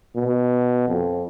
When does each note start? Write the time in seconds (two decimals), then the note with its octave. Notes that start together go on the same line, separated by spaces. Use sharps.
0.16 B2
0.88 F2